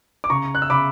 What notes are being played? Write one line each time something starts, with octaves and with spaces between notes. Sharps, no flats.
D6
C#3 A#5 C#6
F#6
E6
C#3 B5 D6